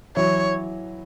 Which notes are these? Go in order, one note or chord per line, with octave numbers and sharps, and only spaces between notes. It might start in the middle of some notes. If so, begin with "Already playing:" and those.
E3 F#3 C#5